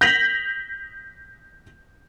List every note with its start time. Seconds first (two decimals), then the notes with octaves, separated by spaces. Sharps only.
0.01 G6 A#6 B6 F7 F#7